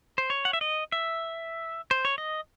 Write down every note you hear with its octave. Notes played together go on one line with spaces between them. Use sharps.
C5
C#5
F#5
E5
D#5
E5
C5
C#5
D#5